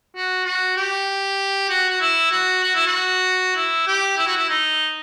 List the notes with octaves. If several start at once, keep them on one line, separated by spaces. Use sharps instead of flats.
F#4
F#4
G4
F#4
F#4
E4
F#4
F#4
E4
F#4
E4
G4
E4
F#4
E4
D#4